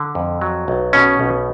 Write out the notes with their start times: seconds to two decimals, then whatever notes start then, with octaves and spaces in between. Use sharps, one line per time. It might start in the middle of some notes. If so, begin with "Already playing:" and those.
Already playing: D3
0.15 F2
0.41 F#3
0.68 B1
0.93 B2 C#4
1.19 B1